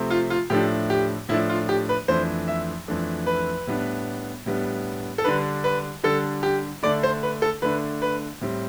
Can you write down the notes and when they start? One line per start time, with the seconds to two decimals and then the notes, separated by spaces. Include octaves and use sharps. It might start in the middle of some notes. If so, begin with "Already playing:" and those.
Already playing: C3 F3 A3 C4
0.10 F4
0.30 F4
0.50 A2 F3 A3 D4 G4
0.90 G4
1.29 A2 F3 A3 D4 E4
1.49 F4
1.69 G4
1.89 B4
2.08 F2 E3 A3 D4 C5
2.48 E5
2.88 F2 E3 A3 D4
3.26 B4
3.67 A2 G3 B3 D4
4.46 A2 G3 B3 D4
5.18 A4
5.24 D3 G3 D4 B4
5.64 B4
6.04 D3 G3 D4 A4
6.43 G4
6.83 D3 A3 D4 D5
7.03 C5
7.23 B4
7.42 A4
7.62 D3 A3 D4 B4
8.02 B4
8.41 A2 G3 C4